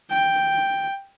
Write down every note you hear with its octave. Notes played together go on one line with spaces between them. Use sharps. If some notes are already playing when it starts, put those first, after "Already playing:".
G5